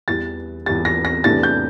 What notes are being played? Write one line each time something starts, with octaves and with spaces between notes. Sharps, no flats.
E2 E3 G3 A6
E2 E3 G3 A6
A#6
A#6
E2 C3 E3 A3 D4 A6
G6